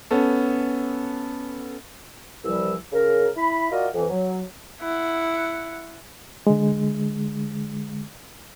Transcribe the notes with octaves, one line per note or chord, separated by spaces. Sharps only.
B3 C#4 A4
C2 E3 F3 G3 E6
C#3 A#4
E4 B5
F4 F#4 A#4 D5 D#5
F2 E3
F#3
E4 F#5
D3 G#3